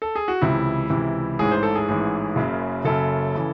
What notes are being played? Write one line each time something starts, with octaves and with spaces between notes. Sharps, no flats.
A4
G#4
F#4
C#2 C3 E3 E4
C#2 C3 E3
A1 G#2 E3 G#4
C5
A4
G#4
A1 G#2 E3
F#1 F#2 C#3
F#1 F#2 C#3 A4
C#3 E3